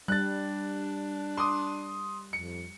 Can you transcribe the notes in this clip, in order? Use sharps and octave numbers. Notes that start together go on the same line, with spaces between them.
G3 D4 F#6 A6
C6 D6 D#6
F2 C#7